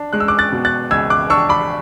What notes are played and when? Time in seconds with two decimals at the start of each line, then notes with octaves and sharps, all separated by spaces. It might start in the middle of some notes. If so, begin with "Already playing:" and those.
Already playing: D4
0.13 G#3 F#6
0.20 E6
0.28 D6 F#6
0.38 F#6 A6
0.52 B2
0.65 F#6 A6
0.91 C#2 E6 G#6
1.10 D6 F#6
1.30 D4 C#6 E6
1.49 B5 D6